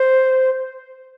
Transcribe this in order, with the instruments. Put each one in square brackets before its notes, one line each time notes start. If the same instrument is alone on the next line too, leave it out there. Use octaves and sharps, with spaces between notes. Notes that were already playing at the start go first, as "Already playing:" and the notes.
Already playing: [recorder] C5